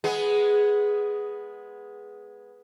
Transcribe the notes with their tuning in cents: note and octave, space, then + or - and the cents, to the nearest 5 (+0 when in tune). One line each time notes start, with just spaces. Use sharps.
G#3 +0 B3 +0 G#4 +0